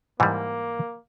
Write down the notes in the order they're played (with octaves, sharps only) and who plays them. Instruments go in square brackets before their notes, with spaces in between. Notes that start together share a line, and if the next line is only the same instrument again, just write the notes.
[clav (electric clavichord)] G#2 E3 G3 [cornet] A#3